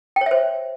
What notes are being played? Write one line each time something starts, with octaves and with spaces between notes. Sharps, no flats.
G5
C#5
E5
C5